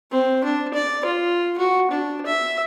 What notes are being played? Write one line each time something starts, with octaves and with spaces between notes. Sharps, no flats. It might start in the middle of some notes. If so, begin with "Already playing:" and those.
C4
D4
D5
F4
F#4
D4
E5